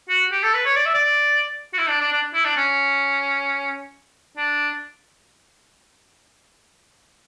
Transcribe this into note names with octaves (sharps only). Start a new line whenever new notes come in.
F#4
G4
A4
B4
C#5
D5
E5
D5
F#4
E4
D4
D4
D4
E4
D4
C#4
D4